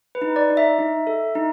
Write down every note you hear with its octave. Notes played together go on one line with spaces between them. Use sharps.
B4
D#4
D5
D#4
E5
D#4
A4
D#4